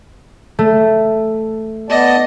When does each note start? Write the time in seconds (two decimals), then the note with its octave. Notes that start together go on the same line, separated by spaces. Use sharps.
0.59 A3
1.90 B3 D5 D#5 A5